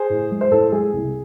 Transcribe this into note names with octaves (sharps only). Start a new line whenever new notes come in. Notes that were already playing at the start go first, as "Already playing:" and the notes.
Already playing: G#4 C5
A2
G#3
C5
A2 A4
G#3 G#4
C2